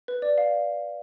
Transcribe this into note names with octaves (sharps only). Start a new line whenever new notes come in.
B4
D5
F5